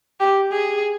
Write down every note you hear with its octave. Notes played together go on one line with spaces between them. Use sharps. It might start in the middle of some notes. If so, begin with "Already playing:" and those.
G4
G#4